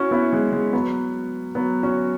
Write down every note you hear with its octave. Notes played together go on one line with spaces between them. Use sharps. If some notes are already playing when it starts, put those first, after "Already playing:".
Already playing: C#4 E4 F#4
B3 E4
G#3
G#3
F#3 B3
F#3 B3
C#4 F#4